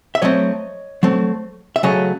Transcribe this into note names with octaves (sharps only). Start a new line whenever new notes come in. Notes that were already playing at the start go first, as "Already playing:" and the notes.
E5
F#3 A3 C4 C#5 D#5
F#3 A3 C4
E5
C#3 F#3 A3 C#5 D#5